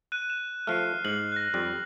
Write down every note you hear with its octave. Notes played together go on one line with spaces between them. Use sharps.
F#6 D#7
E7
F3 A3 F6 C7
G#2 F#7
F#6 A#6
F2 G3